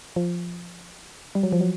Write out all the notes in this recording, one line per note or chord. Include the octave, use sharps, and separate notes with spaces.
F3
G3
F#3
F3
F#3